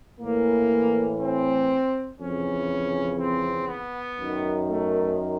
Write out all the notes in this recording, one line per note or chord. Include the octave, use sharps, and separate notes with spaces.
A2 E3 A#3
C4
F2 C#3 E3 C#4
C4
B3
F#2 D#3
A3